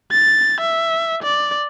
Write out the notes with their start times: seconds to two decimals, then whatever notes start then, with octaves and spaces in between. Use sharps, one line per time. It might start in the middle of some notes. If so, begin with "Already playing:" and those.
0.12 A6
0.61 E5
1.23 D5